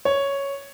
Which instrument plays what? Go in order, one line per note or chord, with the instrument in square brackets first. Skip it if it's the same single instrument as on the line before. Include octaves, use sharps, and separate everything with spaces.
[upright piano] C#5